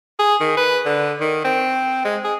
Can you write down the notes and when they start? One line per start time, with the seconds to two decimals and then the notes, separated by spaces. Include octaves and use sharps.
0.19 G#4
0.41 D#3
0.57 B4
0.86 D3
1.21 D#3
1.45 C4
2.05 G#3
2.24 G#4